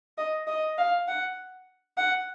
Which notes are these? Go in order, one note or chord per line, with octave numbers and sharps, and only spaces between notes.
D#5
D#5
F5
F#5
F#5